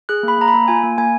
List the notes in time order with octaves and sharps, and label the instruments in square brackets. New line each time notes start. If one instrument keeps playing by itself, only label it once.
[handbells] G#4 F#6
A#3 B5
A#3 A#5
B5
A#3
F4 G#5
A#3
A#3 G#5